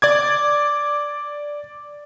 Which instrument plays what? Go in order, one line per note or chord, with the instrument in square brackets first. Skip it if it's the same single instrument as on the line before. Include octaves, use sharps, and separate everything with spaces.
[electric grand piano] D5 D6 G#6